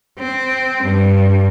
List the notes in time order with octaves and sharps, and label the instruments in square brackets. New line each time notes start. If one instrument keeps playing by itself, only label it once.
[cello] C4
G2